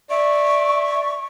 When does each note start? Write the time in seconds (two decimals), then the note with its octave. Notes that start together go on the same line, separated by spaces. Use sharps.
0.10 D5 E5 C#6